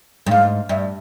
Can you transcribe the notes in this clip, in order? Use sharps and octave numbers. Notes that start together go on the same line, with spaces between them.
G2
G#2 F5
G2 E5